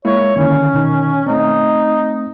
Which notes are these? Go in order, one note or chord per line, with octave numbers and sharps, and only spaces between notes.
G#3 A#3 E4 C#5
D3 D#3 C#4
B2 D#3 D#4
A3 C4 D#4